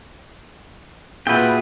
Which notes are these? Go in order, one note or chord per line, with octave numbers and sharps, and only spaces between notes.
A#2 F4 F#4 G#4 B4 E5 G5